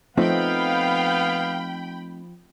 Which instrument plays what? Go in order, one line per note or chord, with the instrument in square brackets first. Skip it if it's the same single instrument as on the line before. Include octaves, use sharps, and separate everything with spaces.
[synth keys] F3 [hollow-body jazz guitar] A3 C4 D#4 [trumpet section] B3 F5 [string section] G5 B5